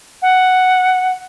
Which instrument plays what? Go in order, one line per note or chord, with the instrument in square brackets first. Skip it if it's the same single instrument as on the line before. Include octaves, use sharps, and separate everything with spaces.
[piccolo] F#5